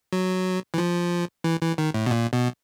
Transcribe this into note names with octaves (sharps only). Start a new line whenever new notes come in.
F#3
E3
F3
E3
E3
D#3
A2
B2
A#2
B2